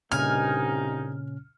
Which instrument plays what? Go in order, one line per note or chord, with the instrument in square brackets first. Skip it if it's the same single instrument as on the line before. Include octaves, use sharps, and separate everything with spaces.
[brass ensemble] C2 G2 D#4 [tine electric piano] A#2 C#3 C#4 [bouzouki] G#5 [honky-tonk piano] F6